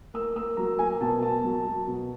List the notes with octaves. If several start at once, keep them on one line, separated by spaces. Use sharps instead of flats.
A#3 E6
A#3 E6
F#3 A#5
A#3 G#5
B2 A5
A#3 A5
F#3
F#3
B2